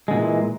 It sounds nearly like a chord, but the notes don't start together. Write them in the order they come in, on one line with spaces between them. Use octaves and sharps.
G#3 D3 A#2 E3